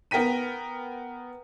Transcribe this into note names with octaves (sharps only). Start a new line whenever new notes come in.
B3 A#4 G5 B6 D#7